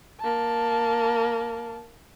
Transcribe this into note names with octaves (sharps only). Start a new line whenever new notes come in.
A#3 A5